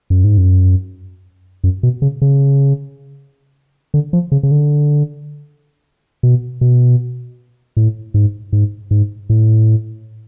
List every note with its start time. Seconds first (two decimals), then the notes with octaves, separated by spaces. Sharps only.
0.10 F#2
0.24 G#2
0.38 F#2
1.64 F#2
1.83 B2
2.02 C#3
2.22 C#3
3.94 D3
4.13 F3
4.32 C#3
4.43 C#3
4.51 D3
6.23 B2
6.61 B2
7.77 A2
8.14 G#2
8.53 G#2
8.91 G#2
9.30 A2